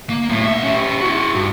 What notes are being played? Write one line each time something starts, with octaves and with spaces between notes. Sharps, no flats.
A#3
B1 A2
D5 E5
C#4 G4
E4 F#4
G2